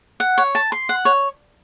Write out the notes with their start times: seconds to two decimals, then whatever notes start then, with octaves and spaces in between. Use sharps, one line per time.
0.20 F#5
0.38 C#5
0.55 A5
0.72 C6
0.89 F#5
1.05 C#5